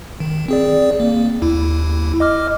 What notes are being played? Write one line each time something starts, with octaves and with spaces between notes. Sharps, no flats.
D#3
C4 G#4 D5
A#3
D#2 E4
D#5 D6 F6